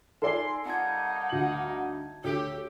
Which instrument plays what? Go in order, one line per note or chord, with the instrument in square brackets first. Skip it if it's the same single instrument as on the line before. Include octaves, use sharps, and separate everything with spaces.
[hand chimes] D#4 F4 G#5 [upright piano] A4 D5 [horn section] C6
[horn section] G3 A#3 D#4 [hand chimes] C4 A5 G#6 [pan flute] F#5
[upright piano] D2 F#7
[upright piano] D2 [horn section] G4 [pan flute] A4 [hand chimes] C#5